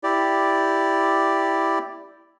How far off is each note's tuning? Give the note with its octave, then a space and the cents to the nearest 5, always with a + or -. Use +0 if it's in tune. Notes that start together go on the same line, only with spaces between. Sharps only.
E4 +0 G4 +0 D5 +0